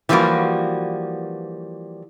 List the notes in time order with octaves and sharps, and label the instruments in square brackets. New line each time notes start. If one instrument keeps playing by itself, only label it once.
[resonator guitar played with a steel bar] E3 F3 G3 A#3 F#4